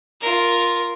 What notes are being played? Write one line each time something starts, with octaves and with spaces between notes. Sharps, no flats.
F4 A#4